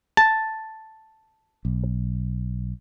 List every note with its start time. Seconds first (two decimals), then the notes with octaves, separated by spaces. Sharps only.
0.17 A5
1.65 B1